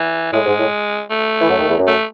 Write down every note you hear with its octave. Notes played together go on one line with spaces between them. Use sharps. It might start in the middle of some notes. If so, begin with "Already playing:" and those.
Already playing: E3
A2 G#3
G#2
A2
A3
E3
F#2 F#3
D#2 D#3
E2 E3
F#2
A3